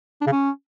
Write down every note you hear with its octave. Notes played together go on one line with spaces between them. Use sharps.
D4
C#3
C#4